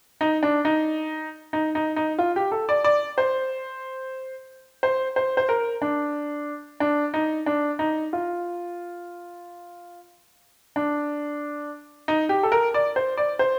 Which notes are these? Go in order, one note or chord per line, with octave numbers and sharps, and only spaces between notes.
D#4
D4
D#4
D#4
D#4
D#4
F4
G4
A4
D5
D5
C5
C5
C5
C5
A#4
D4
D4
D#4
D4
D#4
F4
D4
D#4
G4
A4
A#4
D5
C5
D5
C5